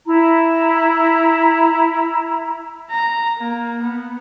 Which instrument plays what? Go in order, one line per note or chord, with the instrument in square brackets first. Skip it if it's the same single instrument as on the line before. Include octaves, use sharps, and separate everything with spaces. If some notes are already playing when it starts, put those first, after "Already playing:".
[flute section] E4 A#5
[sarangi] A#5
A#3
B3